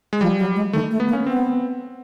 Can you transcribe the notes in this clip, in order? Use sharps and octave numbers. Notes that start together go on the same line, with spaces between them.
G#3
F3 G3
F#3
G#3
D#3 A3
A3
B3
A#3
C#4
B3 C4